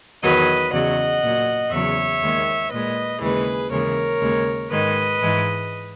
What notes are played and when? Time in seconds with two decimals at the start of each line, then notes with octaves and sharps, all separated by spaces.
0.22 E2 D#3 F#3 B4 D#5
0.72 E2 C#3 F#3 D#5 F#5
1.22 A#2 F#3
1.71 E2 C#3 F#3 C#5 E5
2.22 D#2 D#3 G#3
2.72 A#2 G#3 B4 D#5
3.21 D#2 C#3 E3 G#3 G#4 B4
3.71 D#2 C#3 E3 G#3 A#4 C#5
4.21 D#2 C#3 G#3
4.70 G#2 D#3 G#3 B4 D#5
5.21 G#2 E3 G#3